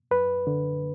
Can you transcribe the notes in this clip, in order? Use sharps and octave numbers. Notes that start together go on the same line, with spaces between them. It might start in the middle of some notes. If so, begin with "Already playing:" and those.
F#2 B4
D3